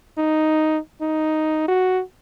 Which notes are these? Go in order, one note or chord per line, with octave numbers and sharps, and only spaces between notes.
D#4
D#4
F#4